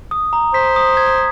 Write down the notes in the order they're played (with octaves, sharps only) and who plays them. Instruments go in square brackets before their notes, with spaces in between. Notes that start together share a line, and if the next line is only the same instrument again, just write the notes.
[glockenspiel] D#6
A#5
[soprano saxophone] C5 [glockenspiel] B6
[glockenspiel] D#6
G#6